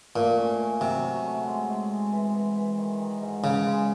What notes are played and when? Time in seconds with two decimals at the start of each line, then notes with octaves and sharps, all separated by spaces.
0.16 A#2 A3
0.37 C#4
0.60 C#4
0.81 C3 F#3
1.03 F#3
1.25 A3
1.47 G#3
1.68 G#3
1.90 C4
2.12 E3
2.34 E3
2.56 E3
2.77 D#3
3.00 D#3
3.22 G#2
3.44 G#2 C#3
3.66 G#3